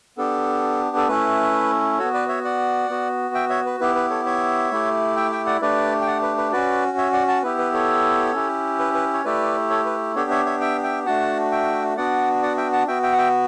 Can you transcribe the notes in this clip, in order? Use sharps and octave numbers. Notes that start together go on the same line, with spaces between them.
B3 D4 G4 A4
A4
A3 C#4 E4 B4
B3 F#4 A4 C#5
B4 D5
C#5 E5
D5 F#5
B3 F#4
E5 G5
C#5 E5
B4
B3 E4 G4 B4
B4
A4 C#5
C#5 E5
A3 E4 G4
E5 G5
E5 G5
D5 F#5
A3 D4 G4 B4 D5
G5
D5 F#5
B4
B4
C#4 F#4 B4 D5
C#5 E5
D5 F#5
F#5 A5
B3 E4 G4 B4
B4
A4 C#5
C#4 E4 G4
B4
B4
C#5
A3 E4 G4 B4 D5
A4 C#5
B4
B3 D4 G4 A4 C#5
C#5 E5
C#5 E5
E5 G5
E5 G5
A3 D4 F#4 F#5 A5
E5 G5
B3 D4 F#4 D5 F#5
D5 F#5
E5 G5
F#5 A5
B3 F#4 E5 G5
E5 G5
F#5
E5 G5